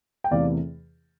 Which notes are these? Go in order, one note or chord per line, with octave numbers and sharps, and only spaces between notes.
G5
E2 C3 E3 A3 E4 D5 F5